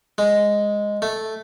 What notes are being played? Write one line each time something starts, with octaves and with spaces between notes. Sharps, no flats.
G#3
A3